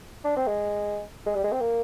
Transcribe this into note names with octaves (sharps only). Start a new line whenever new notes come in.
D4
C4
G#3
G#3
G3
G#3
C4
A#3